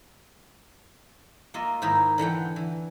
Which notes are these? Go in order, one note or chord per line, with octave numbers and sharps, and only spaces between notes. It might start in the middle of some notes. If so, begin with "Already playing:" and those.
A#3 F4 D#5 E5
G#2 D#3 D#4 E4 A#4 B5
D3 E3 F#5 G5
E3